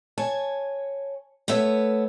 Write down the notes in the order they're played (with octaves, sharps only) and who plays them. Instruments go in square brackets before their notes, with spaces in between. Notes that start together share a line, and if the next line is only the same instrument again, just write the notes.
[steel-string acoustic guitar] C#5 G#5 A5
A3 B3 C#5 E5